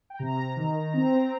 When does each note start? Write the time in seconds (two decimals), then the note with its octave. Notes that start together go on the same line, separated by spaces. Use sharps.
0.10 G5
0.19 C3 A#5
0.38 C3
0.56 D#3
0.74 D#3
0.93 C4 A#5
1.11 C4